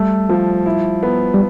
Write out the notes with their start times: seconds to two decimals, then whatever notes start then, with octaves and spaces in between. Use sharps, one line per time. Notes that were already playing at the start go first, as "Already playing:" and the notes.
Already playing: G3 A3
0.29 F3
0.66 E4
1.03 B3
1.34 G3